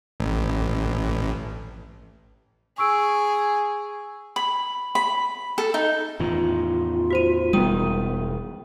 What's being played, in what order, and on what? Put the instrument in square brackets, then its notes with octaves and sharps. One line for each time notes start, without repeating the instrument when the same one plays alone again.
[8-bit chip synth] A1
[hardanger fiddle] G#4 [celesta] C#6 E6 D7
[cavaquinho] B5
B5
A4
D#4
[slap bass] E2 A2 D#3 [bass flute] F4
[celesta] F#4 C5 D#7
[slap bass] E1 D#3 [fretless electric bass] G3 B3 [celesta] G5 D#6 D#7